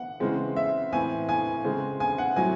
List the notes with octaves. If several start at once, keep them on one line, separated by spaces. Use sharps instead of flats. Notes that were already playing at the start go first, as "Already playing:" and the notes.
Already playing: F#5
C#3 E3 G#3 C4
E5
A2 E3 C4 G#5
G#5
C#3 G#3 C4
G#5
F#5
A2 F#3 C4 G#5